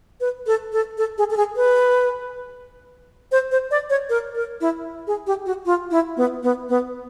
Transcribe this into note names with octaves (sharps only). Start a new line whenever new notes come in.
B4
A4
A4
A4
G#4
A4
G#4
B4
C5
C5
D5
C#5
A#4
A#4
E4
G#4
G4
F#4
F4
E4
B3
B3
B3